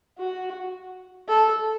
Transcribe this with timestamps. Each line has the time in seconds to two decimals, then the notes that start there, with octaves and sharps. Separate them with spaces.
0.18 F#4
1.28 A4